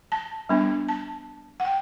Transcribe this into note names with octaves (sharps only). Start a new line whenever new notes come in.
A5
G3 B3 D4
A5
F#5
G5